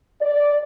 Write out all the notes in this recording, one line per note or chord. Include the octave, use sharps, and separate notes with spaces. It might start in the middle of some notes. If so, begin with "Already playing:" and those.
D5